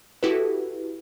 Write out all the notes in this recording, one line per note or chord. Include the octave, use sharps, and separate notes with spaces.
E4 F#4 G4 A4 B4